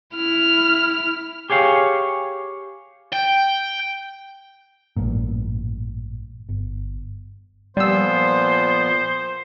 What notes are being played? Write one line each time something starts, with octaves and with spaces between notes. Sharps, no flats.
E4 F6
G4 G#4 C#5 F5
G5
A1 G2 A#2
G1
A#2 F3 G3 B3 C5 E6